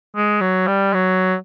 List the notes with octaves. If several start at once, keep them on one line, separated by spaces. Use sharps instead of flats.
G#3
F#3
G3
F#3